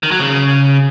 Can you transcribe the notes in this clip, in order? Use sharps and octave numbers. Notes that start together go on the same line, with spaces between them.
D#3
F#3
C#3